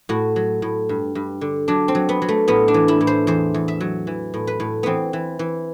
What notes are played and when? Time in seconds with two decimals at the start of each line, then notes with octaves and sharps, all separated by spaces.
0.09 A2 F#4
0.36 F#3
0.62 A2
0.89 G2
1.15 G2
1.41 D3
1.68 F#3 D4
1.88 C4
1.95 F#3
2.09 B3
2.22 F#3
2.28 A3
2.48 A2 B3
2.68 D4
2.74 E3
2.88 E4
3.01 A2
3.07 C5
3.27 E2 C5
3.54 E2
3.68 E5
3.80 F#3
4.07 E3
4.34 A2
4.47 B4
4.60 A2
4.83 E3 B3 C4
5.13 E3
5.39 E3